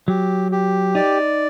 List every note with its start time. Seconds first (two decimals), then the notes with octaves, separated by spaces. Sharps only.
0.08 F#3 G4
0.52 G4
0.95 D#4 D5